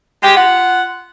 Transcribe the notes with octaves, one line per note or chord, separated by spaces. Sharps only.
G#3 G4
F4 F#5